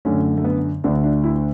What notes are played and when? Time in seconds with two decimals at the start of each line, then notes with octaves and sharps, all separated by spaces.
0.05 F#2 D3 A3 C#4
0.37 A3
0.44 B3
0.84 D2 D3 A3 D4
1.04 D4
1.24 E4